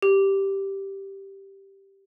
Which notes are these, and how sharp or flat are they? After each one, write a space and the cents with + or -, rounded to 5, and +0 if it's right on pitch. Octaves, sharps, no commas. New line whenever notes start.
G4 -5